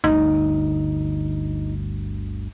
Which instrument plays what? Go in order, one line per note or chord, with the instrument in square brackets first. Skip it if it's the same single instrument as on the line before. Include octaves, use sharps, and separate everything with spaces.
[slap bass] G1 D2 [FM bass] D#4